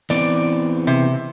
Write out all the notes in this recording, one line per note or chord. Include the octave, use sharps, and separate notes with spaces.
E3 B3 C4 D5
C3